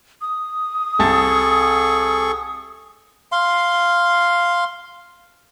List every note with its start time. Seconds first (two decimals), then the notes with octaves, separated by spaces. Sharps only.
0.22 D#6
0.99 C2 G#4 A4 A5 C#6 A6
3.32 F5 C6